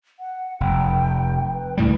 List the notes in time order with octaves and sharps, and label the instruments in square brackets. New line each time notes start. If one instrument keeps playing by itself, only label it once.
[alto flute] F#5
[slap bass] F1 [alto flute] G5
[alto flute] B4
[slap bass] C#2 A2 G3 [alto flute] E4